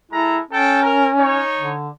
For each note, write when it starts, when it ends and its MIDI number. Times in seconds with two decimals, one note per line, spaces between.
0.12 0.37 56
0.12 0.40 64
0.12 0.37 69
0.12 0.37 82
0.51 1.39 61
0.51 0.78 69
0.51 0.78 79
0.51 0.78 81
0.83 1.08 70
1.18 1.73 63
1.18 1.73 73
1.57 1.89 50